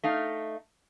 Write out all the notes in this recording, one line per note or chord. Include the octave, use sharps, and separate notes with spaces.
A3 D#4 F5